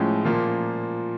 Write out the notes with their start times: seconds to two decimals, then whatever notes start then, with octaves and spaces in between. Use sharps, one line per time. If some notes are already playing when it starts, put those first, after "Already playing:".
Already playing: A2 F3 G#3 C#4
0.25 A#2 F3 A#3